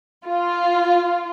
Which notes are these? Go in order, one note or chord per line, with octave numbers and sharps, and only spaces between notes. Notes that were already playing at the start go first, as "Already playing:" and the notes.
F4